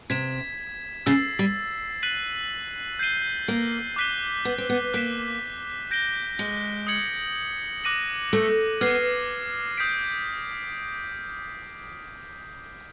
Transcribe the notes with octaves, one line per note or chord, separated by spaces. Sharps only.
C3 G#6 B6 E7
C#3 E6 A6 C7
G3
F#6 B6 D#7 F#7
G6 C7 D#7 G7
A#3
D6 F#6 B6 D#7 G7
B3
C4
B3
A#3 F#6 B6 E7
G6 A#6 D7 G7
G#3
D#6 G#6 C#7 F#7
D6 F#6 A#6 D#7 F#7
A3
B3 D6 F6 G#6 C7
D#6 G6 B6 D7